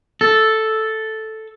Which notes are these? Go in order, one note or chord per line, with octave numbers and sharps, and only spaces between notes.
A4